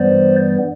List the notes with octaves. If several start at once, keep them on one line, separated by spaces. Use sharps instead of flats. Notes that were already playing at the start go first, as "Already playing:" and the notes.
Already playing: G2 E3 G3 B3 C5 D5